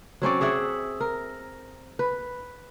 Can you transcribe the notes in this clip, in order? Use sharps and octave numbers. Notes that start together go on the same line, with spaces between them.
F#3 C4 C#4 D5
G#4 D5 E5 F#5
A#4
B4